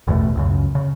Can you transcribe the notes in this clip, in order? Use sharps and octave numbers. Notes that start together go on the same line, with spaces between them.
A1 E2 B2 A3
C#2 F#2 C#3
C#3